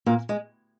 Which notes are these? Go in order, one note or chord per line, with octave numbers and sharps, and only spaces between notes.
A#2 A#3
G#3